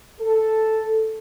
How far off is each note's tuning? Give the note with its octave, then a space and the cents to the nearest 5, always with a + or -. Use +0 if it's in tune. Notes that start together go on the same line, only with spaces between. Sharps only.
A4 +0